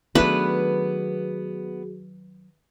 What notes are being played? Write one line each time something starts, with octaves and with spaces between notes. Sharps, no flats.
D#3 F#3 A3 B3 D4 F#4 G#4 B4